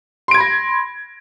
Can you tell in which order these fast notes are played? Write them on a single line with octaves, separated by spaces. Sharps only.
C6 D7 G#6 B5 A#6